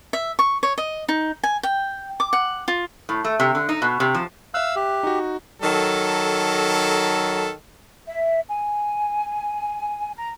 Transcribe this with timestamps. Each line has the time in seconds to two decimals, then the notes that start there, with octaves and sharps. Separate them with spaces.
0.13 E5
0.39 C#6
0.63 C#5
0.78 D#5
1.08 D#4
1.43 G#5
1.63 G5
2.20 D6
2.33 F#5
2.68 F4
3.09 A2
3.24 A3
3.40 C3
3.55 D3
3.69 D#4
3.82 B2
4.00 C3
4.14 F3
4.54 E5 F5 E6 F#6
4.76 G4
5.03 D#4 F#4
5.60 D#3 F#3 A4
8.07 E5
8.48 G#5
10.16 A#5